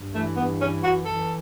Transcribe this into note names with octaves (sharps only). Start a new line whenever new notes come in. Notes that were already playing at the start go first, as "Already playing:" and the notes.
Already playing: G2
E3 A3
G2 B3
E3 C#4
F#2 F#4
E3 A4